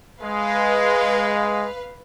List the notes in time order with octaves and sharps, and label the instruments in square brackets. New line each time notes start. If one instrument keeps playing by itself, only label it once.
[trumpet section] G#3 [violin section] B4 F5